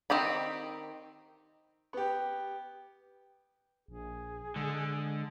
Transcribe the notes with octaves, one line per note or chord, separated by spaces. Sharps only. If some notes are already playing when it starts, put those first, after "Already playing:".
D#3 C4 G4 B5
B3 G4
A#1 G#4
D3 G#3